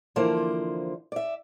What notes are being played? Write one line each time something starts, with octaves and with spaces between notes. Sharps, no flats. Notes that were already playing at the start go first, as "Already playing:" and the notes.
D3 E3 F3 A#3 C5 D5
D5 E5